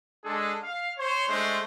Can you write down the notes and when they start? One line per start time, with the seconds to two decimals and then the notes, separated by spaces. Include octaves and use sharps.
0.24 G#3 D4 G#4 A4
0.63 F5
0.98 C5 C#5
1.29 G#3 A3 D4 C5